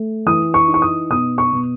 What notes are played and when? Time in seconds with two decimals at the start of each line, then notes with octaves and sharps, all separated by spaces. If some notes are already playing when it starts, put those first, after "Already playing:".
Already playing: A3
0.26 E3 D#6
0.54 C#6
0.68 D#4
0.74 C#6
0.82 D#6
1.10 B2 D#6
1.38 C#6
1.53 B2